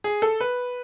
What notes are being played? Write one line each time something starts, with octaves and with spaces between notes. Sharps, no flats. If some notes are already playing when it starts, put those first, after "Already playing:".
G#4
A4
B4